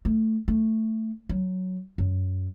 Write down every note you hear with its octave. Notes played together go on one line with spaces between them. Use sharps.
A3
A3
F#3
F#2